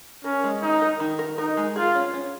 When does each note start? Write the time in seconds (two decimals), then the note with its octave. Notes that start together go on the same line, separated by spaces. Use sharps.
0.24 C#4 A#4
0.44 G#3
0.62 D#3 D#4
0.82 A#4
1.00 D#3
1.19 A#4
1.38 D#4 A#4
1.57 G#3
1.76 F4 G#4
1.95 C#4
2.14 C#4